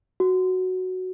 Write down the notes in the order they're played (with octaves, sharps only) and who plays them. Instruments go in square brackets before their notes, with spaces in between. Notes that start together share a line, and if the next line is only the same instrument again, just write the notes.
[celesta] F#4